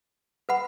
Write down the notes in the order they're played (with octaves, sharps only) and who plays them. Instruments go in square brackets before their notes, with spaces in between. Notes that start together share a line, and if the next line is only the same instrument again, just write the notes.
[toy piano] B4 F#5 B5